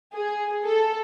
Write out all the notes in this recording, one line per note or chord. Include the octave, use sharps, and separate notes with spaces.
G#4
A4